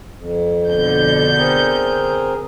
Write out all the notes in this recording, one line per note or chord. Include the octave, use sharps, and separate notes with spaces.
F2
B2 D3 G6
C4 G#4 A#4